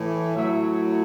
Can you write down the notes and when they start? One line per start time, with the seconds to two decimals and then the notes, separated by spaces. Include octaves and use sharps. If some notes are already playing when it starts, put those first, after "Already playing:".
Already playing: A2 E3
0.36 A2 F#3 E5